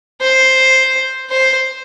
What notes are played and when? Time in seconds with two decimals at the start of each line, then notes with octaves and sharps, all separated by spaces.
0.21 C5
1.30 C5